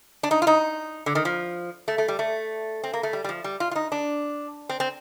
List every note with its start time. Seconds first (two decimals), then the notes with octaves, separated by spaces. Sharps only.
0.23 D4
0.31 D#4
0.42 F4
0.47 D#4
1.06 D3
1.15 D#3
1.25 F3
1.88 A3
1.98 A3
2.08 G3
2.19 A3
2.83 C4
2.93 A#3
3.03 A3
3.13 G3
3.24 G3
3.29 F3
3.44 G3
3.60 F4
3.71 F4
3.76 D#4
3.92 D4
4.69 C4
4.80 C4